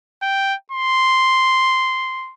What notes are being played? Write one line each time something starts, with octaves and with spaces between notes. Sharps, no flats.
G5
C6